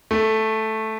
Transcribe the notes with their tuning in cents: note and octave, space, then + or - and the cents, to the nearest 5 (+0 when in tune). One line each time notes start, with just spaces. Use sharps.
A3 -5